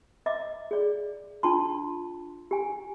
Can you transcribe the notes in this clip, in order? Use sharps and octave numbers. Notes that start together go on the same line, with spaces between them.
D#5 E5 D6
G#4 D5
D4 F4 A5 C6
G4 G#5